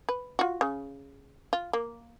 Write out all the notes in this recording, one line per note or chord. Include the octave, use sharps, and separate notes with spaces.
B4
F4 F#4
C#3
F4
A#3